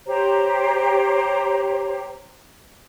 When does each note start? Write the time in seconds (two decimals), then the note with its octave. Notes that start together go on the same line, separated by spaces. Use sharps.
0.06 G4 C5 C#5 A#5